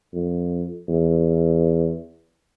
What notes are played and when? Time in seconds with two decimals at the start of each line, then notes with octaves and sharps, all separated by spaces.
0.13 F2
0.88 E2